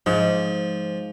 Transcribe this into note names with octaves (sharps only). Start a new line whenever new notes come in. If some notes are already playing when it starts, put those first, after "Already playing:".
G#2 F3